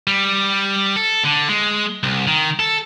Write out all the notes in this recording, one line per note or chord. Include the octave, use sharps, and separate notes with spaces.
G3
A4
D3
G#3
C2
D#3
A4